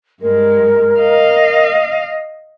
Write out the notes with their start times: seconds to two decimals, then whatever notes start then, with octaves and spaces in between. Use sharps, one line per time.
0.22 G2 G#3 A#4
0.99 D#5 F5